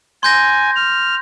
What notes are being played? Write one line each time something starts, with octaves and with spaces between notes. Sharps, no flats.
G#5 C6 G6 A#6
F6